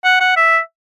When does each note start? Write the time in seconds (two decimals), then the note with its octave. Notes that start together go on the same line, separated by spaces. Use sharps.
0.04 F#5
0.20 F#5
0.37 E5